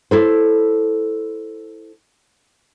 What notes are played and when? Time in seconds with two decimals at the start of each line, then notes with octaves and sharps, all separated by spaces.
0.11 E4 A4 C5